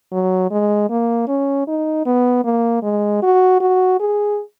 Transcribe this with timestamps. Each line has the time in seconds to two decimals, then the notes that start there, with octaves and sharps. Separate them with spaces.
0.12 F#3
0.51 G#3
0.90 A#3
1.28 C#4
1.67 D#4
2.06 B3
2.44 A#3
2.83 G#3
3.23 F#4
3.60 F#4
4.00 G#4